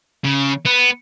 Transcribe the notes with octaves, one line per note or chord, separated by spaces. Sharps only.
C#3
B3